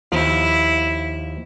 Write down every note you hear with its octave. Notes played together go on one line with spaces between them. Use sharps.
D#2 F3 E4